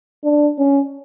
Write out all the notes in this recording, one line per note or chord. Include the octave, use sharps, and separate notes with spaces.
D4
C#4